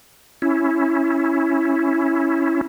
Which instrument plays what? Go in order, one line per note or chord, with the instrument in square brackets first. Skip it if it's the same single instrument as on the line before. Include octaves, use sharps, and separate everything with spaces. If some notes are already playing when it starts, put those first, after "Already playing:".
[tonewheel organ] C#4 E4